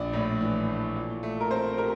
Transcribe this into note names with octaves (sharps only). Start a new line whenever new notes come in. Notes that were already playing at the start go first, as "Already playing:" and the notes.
Already playing: A#1 D4 D5
A2
E3
A3
A#2
A3
A#4
C4 C5
G4 A#4